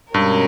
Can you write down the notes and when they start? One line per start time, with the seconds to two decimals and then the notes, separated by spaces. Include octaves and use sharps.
0.14 G2 B2 G#3 C#4 G4 A#4